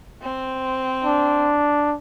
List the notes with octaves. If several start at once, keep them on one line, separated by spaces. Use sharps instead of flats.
C4
D4